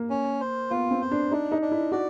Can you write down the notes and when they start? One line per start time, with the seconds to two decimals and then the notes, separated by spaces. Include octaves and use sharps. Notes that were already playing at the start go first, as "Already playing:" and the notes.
Already playing: A#3
0.10 C#4
0.41 C5
0.71 B3 F4
0.91 C4
1.01 C5
1.11 D4
1.31 D4 D#4
1.52 D#4
1.62 D4
1.72 E4
1.92 F#4 D5